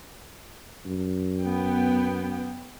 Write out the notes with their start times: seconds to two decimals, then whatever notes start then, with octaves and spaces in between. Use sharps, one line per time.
0.86 F#2
1.41 B3 G5